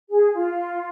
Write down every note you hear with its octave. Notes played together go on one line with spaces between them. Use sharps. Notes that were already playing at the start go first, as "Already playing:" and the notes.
G#4
F4